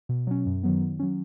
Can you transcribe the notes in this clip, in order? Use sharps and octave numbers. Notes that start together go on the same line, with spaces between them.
B2
F#3 C#4
F#2
D#3 F#3 B3
D#3
F#3 C#4